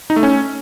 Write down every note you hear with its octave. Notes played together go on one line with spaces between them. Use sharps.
D#4
A3
C#4